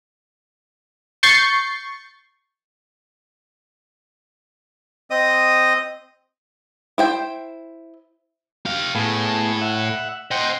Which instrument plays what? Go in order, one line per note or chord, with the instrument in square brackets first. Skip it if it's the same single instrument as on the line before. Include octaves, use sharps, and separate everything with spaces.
[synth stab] C#6 G6 A6 C7
[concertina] C4 D#5 D#6
[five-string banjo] E4 C5 G5
[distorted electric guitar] G4 F5
[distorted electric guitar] A2 [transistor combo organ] A3 B3 G#4
[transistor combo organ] E5 F#5
[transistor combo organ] C5 G5 [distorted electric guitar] D#5 F#5